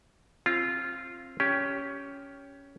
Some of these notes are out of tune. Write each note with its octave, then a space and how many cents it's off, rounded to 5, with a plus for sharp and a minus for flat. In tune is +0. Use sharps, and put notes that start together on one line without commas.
C4 +25 F4 -10
C#4 +10 G4 +0